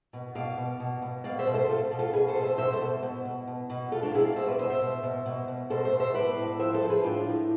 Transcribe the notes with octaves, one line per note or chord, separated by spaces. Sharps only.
B2
B2 D5 F5
B2
B2
B2
B2 D5 F5
C5 E5
B2
A4 C5
B2 F4 A4
B2
F4 A4
B2 G#4 B4
A4 C5
B2
C5 E5
B2 C5 E5
A4 C5
B2
B2
B2
B2
B2
B2 F4 A4
D4 F4
B2 E4 G#4
D5 F5
B2 C5 E5
B4 D5
B2 C5 E5
C5 E5
B2
B2
B2
B2
B2 A4 C5
C5 E5
B2
C5 E5
A2 B4 D5
A2
F3 C5 E5
A4 C5
F3
G#4 B4
A2 D4 F4
A2